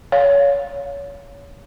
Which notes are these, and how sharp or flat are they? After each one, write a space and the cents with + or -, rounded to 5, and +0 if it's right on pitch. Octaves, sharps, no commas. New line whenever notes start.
C#5 +25 F5 +0